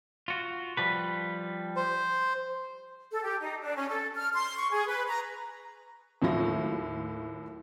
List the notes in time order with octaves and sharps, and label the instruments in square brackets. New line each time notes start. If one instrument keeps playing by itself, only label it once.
[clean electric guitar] F4 F#4
F3 G3 B4
[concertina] C5
[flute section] A4
G4
D#4
D4
C#4
A4
F6
C6
C#6
G#4
B4
A#5
[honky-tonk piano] D#2 A2 F#3 A3 F4 A#6